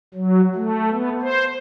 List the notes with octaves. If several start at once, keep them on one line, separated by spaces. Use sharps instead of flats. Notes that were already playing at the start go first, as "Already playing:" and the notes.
F#3
A3
B3
C5